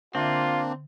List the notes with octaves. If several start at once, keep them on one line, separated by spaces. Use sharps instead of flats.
D3 A#3 C4 D4 F4 E5